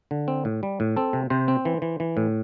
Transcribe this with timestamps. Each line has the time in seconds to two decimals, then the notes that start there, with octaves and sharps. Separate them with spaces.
0.11 D3
0.28 C4
0.45 A2
0.63 G3
0.80 A2
0.96 C4 A4
1.13 C3
1.30 C3 C5
1.48 C4
1.65 E3
1.82 E3
2.00 E3
2.17 A2